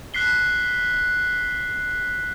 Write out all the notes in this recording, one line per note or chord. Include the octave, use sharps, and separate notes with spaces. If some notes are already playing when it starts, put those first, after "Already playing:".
F#6 B6 C7 G7